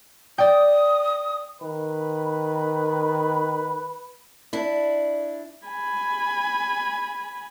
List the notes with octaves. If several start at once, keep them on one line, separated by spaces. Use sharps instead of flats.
D5 G5 D#6
D#3 B4
D4 E4
G#5 B5